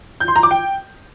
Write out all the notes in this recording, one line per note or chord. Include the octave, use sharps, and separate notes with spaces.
G6
C6
A#5
D6
G5